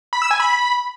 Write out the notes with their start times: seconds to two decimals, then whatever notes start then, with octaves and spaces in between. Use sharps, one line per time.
0.13 B5
0.22 E6
0.31 G#5
0.40 B5